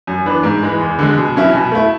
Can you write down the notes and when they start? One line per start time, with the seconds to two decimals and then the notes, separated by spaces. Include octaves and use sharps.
0.07 F#2
0.26 E3 B3 D4
0.43 G#2
0.63 E3 G#3
0.81 E2
0.99 D3 G#3
1.17 B2
1.36 F#3 C#4 E4
1.54 B2
1.72 A3 E4